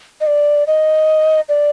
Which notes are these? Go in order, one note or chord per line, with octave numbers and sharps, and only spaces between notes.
D#5
D5
D#5
D5